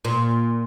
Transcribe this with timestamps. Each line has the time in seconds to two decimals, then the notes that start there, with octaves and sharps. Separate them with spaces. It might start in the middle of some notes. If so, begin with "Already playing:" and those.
0.05 A#2